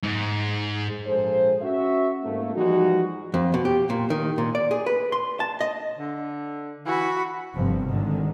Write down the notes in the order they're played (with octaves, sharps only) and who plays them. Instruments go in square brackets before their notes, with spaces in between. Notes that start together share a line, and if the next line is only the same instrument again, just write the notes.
[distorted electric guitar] G#2
[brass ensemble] A#1 G#3 A#3 G#4 A4 C5
C#4 F#4 E5
G#1 A3 A#3
E3 F3 G3 G#3 D#4 F#4
[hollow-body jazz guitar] F2
B2
G4
A#2
D#3
A#2
D5
G#4
B4
C6
A5
D#5
[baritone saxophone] D3
[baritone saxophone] E3 [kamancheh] F#4 B5
[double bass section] G1 G2 C3 F3 C4
G#1 D3 D#3 G#3